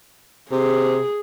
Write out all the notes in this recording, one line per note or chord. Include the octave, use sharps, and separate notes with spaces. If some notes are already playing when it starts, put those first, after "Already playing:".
C3 G#4